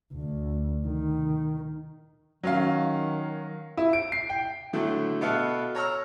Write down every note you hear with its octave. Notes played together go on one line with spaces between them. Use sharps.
D2
D#3
D#3 F#3 C#4 F5
E4
D7
C7
G5
A2 D3 F#3 A3
B2 B3 A4 E5 F5
C#5 A#5 E6 F6